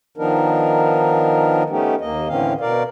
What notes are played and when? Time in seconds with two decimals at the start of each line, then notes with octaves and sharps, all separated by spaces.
0.18 D#3 F3 B3 D4 D#4 A#4
1.70 A3 B3 C#4 D#4 G4
2.01 D#2 A#3 D#5
2.29 A2 D3 E3 C4 C#4 F5
2.61 B2 A#4 D5 F5